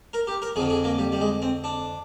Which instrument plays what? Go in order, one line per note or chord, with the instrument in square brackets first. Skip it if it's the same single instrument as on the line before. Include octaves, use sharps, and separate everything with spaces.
[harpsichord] A#4
G4
A#4
F2 G#4
D3
G#4
A#3
G3
G3
G#3
C4
D4